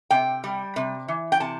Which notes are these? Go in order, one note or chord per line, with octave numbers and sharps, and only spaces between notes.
C3 G5
G3
C3
E3
G5
C3 A5